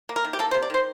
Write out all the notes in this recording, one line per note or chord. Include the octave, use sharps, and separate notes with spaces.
A#3
A#4
D#3
G4
A#3 A4
C5
C3
D5
D#3 C5